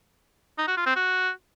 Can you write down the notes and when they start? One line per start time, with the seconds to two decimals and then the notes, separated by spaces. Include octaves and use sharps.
0.58 D#4
0.68 F#4
0.77 F4
0.86 C4
0.96 F#4